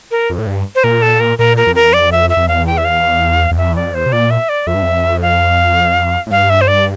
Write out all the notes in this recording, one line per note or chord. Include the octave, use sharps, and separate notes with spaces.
A#4
F2
A2
G2
C5
A#2 A#4
A4
A#4
A#2 A#4
A#4
F2
E2 A#4
F2 D5
E5
E5
F2
E2 F5
G5
E5
F5
E2
F2 E5
E2
F2 D5
E2 C5
C3
A#2 D5
E5
D5
F2 E5
G2
F2
F5
A2
G2 F5
E5
C5
D5